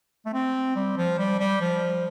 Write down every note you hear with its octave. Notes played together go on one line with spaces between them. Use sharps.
A3
C4
G3
F3
G3
G3
F3